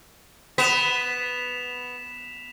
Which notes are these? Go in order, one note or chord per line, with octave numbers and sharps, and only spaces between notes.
B3 B6 E7 F7